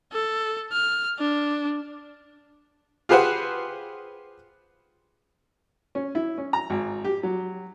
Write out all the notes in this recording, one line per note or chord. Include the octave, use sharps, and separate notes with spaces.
A4
F6
D4
F4 G4 G#4 B4 C5 F#5
C#4
E4
C#4
A#5
G#1
G4
F#3